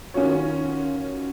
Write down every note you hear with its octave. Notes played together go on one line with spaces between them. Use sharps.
D#3 C#4 F4 F#4 C#5